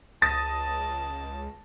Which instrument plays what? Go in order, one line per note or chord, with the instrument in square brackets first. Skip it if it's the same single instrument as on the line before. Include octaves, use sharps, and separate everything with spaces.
[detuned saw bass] C#2 [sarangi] A5 [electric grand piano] D#6 A#6 [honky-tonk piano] A6